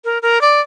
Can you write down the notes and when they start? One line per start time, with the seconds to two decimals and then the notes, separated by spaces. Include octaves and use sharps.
0.05 A#4
0.22 A#4
0.41 D5